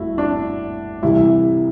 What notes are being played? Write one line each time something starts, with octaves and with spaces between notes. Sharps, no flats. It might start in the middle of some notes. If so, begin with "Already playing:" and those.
Already playing: G1 A3 E4 F#4
D4
C2 C3 E3 G3 E4